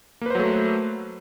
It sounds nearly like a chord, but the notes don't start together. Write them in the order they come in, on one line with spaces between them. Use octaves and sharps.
A#3 B4 C5 F#3 A3